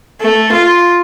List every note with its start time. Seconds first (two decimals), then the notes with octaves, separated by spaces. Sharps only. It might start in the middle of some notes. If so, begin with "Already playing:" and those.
0.22 A3
0.54 F4